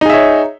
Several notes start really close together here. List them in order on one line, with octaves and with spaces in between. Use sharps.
D#4 G#4 E5 C#5